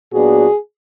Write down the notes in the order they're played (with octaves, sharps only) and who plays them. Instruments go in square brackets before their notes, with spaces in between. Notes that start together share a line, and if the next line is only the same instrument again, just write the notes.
[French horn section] A#2 F#3 B3 D4 F#4 G#4